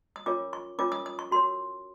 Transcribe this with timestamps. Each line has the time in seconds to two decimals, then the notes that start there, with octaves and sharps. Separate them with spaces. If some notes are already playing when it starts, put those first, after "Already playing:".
0.16 D#6
0.26 C#4 F4 A#4 C#5 D6
0.53 C#6
0.78 C#4 F4 A#4 C#5 D6
0.92 D#6
1.06 D#6
1.19 C#6
1.31 F#4 A#4 C#5 C6